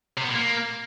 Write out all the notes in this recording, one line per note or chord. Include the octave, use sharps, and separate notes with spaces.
C3
B3
A#2
A#3